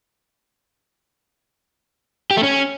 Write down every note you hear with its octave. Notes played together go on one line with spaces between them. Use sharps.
G4
A3
C#4